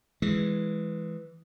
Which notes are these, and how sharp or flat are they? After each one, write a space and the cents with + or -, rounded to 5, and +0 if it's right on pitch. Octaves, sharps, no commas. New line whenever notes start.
E3 +0 G#3 +0